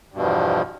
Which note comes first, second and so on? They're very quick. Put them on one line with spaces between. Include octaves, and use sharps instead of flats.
G2 B2 E2 F3